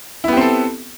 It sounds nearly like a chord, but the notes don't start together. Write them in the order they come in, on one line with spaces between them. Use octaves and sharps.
E4 B3 G4 C4 A4